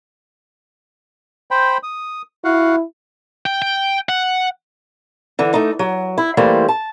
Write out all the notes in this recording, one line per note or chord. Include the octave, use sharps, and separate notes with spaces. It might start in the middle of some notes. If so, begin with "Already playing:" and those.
C5 G5 B5
D#6
E4 F#4 F5 F#5
G5
G5
F#5
D3 E3
A3 D#4
F#3
E4
E3 G3 A3 A#3 C5
A5